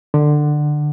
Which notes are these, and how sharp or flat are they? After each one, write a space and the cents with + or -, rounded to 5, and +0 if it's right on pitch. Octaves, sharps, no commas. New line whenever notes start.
D3 +20